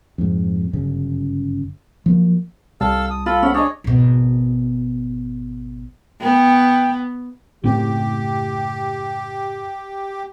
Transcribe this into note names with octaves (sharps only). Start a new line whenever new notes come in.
F2 G#2
G1 F#2 C#3
F3 F#3 A#3
C2 G3 A4 F5 A5 E6
D#6
F4 A4 B5
C#4 F#5
D4 G#4 C#5 D#5
G#1 B2
B3 G5
F#1 A2 C4 G4